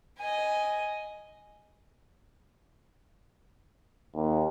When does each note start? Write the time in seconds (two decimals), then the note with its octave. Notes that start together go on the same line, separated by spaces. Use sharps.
0.19 D#5 G#5
4.15 D#2